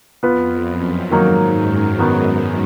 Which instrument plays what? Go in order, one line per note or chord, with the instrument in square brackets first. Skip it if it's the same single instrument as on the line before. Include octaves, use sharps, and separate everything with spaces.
[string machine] F2 [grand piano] B3 F4 B4
[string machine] F#2
[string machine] G#2 [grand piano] D#3 F#3 A#3 D#4
[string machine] F#2
[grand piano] D#3 F#3 B3 D#4